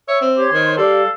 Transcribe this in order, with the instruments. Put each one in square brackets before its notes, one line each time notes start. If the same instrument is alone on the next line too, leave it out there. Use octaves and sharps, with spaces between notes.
[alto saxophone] C#5 [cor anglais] E5
[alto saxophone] C4
[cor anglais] G4 [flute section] C#5 C6
[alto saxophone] D#3 [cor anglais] C5
[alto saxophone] G3 [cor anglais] A4 [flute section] F5